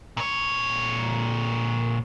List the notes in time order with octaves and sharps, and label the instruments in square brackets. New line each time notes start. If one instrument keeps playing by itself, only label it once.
[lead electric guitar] A#2 C#5